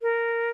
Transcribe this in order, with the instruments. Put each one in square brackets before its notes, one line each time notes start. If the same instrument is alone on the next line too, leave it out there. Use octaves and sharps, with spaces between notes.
[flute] A#4